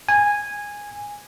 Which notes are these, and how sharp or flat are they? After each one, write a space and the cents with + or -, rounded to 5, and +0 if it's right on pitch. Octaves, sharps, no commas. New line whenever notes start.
G#5 -10